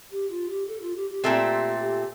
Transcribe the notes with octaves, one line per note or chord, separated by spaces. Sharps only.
G4
F4
G4
A4
F4
G4
G4
A#2 A3 C4
G4